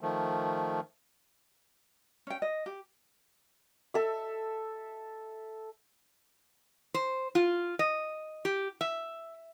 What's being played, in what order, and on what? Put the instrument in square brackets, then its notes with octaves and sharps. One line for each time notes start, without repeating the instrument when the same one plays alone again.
[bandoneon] D#3 F3 A3
[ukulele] C#4 G5
D#5
G4
[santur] A4 E5
[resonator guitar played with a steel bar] C5
F4
D#5
G4
E5